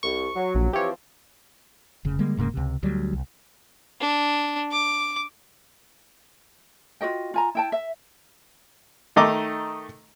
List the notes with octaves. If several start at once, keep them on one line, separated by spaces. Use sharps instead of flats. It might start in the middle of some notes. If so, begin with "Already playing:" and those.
C2 C#6
F#3
A#1
E3 F3 C4 G4 C#5
F1 C#3
D3 G3 G#3 A#3
E1 G#2 C#3 A#3
C#2 C3
D2 F#3 G3
C2
D4
D6
F4 F#4 D#5 G5
F4 G#5 A#5
E4 G5 A5
E5
D#3 A3 D#5 A#5 D6 D#6